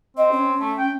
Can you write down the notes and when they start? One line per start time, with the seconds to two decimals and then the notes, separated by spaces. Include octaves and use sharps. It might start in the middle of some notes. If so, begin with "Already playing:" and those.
0.17 C4 D#5
0.32 C#4
0.60 A3
0.78 G5